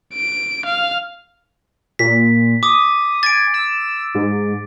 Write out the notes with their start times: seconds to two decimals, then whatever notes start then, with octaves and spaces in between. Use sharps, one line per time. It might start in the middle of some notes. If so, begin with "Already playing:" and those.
0.14 D7
0.66 F5
1.99 A#2 B6
2.63 D6 D#6
3.23 G#5 A6 D7
3.54 E6
4.15 G#2